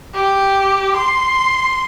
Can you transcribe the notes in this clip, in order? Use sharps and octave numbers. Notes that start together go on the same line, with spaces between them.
G4
C6